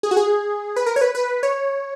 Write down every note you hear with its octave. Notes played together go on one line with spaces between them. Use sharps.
G#4
F#4
G#4
B4
A#4
C#5
B4
B4
C#5